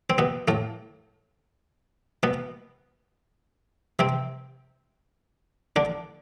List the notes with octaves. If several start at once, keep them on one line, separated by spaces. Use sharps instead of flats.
C4
B2 B3
A2 A3
B2 B3
C3 C4
D3 D4